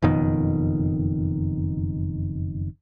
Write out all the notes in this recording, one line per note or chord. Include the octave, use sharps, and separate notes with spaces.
F#1 F2 B2 D#3